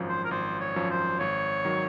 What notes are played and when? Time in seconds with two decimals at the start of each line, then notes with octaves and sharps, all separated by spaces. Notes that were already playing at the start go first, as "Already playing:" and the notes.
Already playing: G#1 F#2 F3
0.09 C5
0.25 A#4
0.31 G#1 C5
0.60 C#5
0.76 F#2 F3
0.90 C5
1.19 G#1 C#5
1.65 D#3 F#3